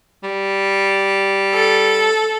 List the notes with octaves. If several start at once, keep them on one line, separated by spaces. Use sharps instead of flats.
G3
A4